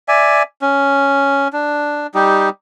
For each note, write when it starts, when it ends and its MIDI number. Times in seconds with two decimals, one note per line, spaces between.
0.08 0.43 74
0.08 0.43 76
0.08 0.43 80
0.62 1.48 61
1.53 2.07 62
2.14 2.49 55
2.14 2.49 63
2.14 2.49 67